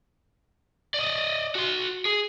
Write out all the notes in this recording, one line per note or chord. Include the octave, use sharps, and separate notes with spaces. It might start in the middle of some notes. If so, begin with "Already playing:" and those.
D5 D#5
F#4 C6
G#4